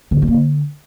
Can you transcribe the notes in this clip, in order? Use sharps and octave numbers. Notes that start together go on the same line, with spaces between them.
D3
G#2
A3
A#3
D3